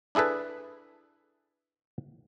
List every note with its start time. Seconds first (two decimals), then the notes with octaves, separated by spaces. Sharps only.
0.15 D4 E4 G#4 A4 B4